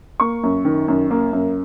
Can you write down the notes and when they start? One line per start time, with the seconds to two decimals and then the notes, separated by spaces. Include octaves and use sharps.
0.20 A#3 C#6
0.43 F#2
0.65 D#3
0.88 F#2
1.11 A#3
1.33 F#2